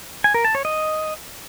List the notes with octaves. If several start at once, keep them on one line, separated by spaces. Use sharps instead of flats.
G#5
A#4
A5
C#5
D#5